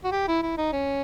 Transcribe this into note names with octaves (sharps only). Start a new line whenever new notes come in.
F#4
G4
E4
E4
D#4
C#4